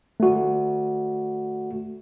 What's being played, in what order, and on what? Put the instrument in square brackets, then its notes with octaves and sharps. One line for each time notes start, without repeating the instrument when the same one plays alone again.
[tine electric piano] A3 F#4